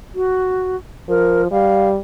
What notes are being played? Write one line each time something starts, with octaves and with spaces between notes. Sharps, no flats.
F#4
F3 A#4
G3 F5